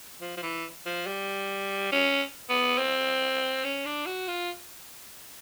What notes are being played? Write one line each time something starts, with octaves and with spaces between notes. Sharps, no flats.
F3
F3
E3
F3
G3
C#4
B3
C4
C#4
D4
F#4
F4